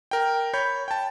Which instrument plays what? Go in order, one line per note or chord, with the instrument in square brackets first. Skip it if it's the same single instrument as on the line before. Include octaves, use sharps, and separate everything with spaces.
[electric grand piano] A#4 G5
C#5 B5 G6
G5 A5